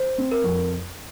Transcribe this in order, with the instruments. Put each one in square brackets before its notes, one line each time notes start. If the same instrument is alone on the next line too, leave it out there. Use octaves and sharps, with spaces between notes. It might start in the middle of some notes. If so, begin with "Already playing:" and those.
Already playing: [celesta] C5
[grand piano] C4
[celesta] A#4
[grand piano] F2